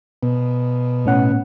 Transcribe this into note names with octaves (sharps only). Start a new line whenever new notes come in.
B2
A2 C#4 F#5